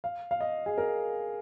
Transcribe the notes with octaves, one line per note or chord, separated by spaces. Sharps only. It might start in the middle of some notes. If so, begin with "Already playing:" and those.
F5
F5
D#5
G#4
A#4